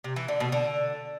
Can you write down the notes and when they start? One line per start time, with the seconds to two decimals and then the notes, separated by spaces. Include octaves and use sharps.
0.04 C3
0.16 E3
0.28 D3
0.40 B2
0.52 D3